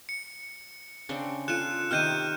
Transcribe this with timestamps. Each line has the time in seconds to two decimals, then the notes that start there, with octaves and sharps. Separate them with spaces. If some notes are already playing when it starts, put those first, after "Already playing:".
0.09 C#7
1.09 C#3 C4 D4
1.48 F4 A4 F#6 C#7 E7
1.91 C3 D#3 D#5 F6 G6 D#7